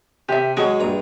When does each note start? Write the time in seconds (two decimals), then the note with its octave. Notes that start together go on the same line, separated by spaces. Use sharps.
0.29 C3 G4 E5
0.57 F#3 G#3 F#4 G#4 C#5
0.80 A#1 G2 A#5